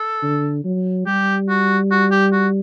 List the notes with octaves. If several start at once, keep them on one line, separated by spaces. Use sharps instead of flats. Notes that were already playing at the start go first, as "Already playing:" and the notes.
Already playing: A4
D3
F#3
G3 G4
F#4
F#4
G4
F#4